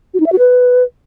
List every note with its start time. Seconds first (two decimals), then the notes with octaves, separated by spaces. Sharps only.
0.14 F#4
0.20 D#4
0.26 E5
0.32 F#4
0.39 B4